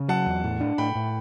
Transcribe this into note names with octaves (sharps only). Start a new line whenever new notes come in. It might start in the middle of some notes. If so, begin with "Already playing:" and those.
Already playing: C#3
F#3 F#5 A5
E2
A2
D4
A2 G5 B5
A2